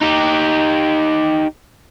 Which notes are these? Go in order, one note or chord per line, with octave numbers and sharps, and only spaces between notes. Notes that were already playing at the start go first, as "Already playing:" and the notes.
D#4 G4